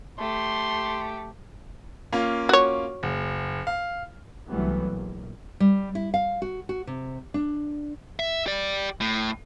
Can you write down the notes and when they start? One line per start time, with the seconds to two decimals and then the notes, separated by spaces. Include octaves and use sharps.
0.18 A3 G4 C6
2.12 A#3 C#4 F4
2.49 F#4 C#5
3.03 F#1
3.67 F5
4.47 C2 E3 F#3 G3 A3 B3
4.91 A#1
5.60 G3
5.95 E4
6.14 F5
6.42 F#4
6.69 F#4
6.87 C3
7.34 D4
8.19 E5
8.46 G4 D5
9.00 A2